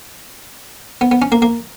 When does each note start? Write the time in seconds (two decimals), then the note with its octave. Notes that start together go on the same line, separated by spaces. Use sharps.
1.01 B3
1.11 B3
1.22 C#4
1.32 A#3
1.42 A#3